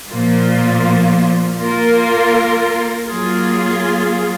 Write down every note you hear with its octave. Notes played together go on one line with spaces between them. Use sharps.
A#2 F3 A#3 F4
A#3 F4 A#4
F#3 A#3 F4 G#4